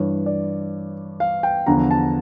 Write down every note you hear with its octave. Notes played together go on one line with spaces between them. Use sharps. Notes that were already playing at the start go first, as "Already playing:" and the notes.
Already playing: G2 E3 C#5
D5
F5
G5
E2 D3 F3 A#5
A5